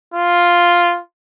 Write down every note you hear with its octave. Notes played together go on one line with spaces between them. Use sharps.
F4